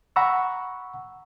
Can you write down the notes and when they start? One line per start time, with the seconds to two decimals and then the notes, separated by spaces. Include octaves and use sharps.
0.16 F#5 A#5 B5 C#6 E6